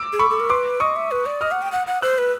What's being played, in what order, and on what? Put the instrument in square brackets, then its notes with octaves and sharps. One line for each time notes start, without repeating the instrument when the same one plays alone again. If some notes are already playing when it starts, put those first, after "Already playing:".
Already playing: [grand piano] D6 E6
[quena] G#4
[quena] A4 [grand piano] B5 C#6
[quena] A4
A#4
[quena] B4 [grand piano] C6 D6
[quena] D#5 [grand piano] C#6 D#6
[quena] E5
B4
D5
[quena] D#5 [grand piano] D#6 F6
[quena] F#5
G5
F#5
F#5
[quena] C5 [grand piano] E6 F#6
[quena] B4